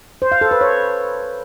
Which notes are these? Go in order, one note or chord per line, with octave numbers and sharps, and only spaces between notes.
C5
F5
A4
B4
C#5